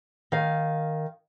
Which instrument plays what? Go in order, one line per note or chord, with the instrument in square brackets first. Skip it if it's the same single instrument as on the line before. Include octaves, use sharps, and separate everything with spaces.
[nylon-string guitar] D#3 F5